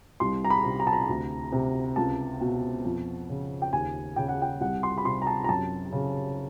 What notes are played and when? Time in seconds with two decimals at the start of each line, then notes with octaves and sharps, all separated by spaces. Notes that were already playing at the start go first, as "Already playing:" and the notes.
0.20 C2 C6
0.44 A#5
0.50 B5
0.64 C3
0.80 A#5
0.87 A5
0.93 A#5
1.09 D2
1.52 C3
1.96 C#2 A5
2.41 B2
2.85 F2
3.29 C#3
3.62 G5
3.73 D#2 G#5
4.16 C#3 G5
4.29 F#5
4.42 G5
4.61 C2 F#5
4.83 C6
4.98 B5
5.05 C3 C6
5.22 A#5
5.27 A5
5.44 A#5
5.49 F#2 A5
5.93 C#3